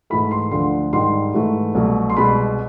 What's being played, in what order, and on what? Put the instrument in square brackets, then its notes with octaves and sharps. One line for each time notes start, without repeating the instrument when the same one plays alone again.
[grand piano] G#2 E3 A3 B5
C6
D2 D3 F3 C6
G#2 D#3 G3 C6
G#2 E3 A3
C2 B2 F#3 A3
C6
C2 B2 G#3 B5